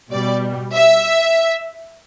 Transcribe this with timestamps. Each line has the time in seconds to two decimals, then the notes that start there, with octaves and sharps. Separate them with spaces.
0.11 B2 G3 D5
0.73 E5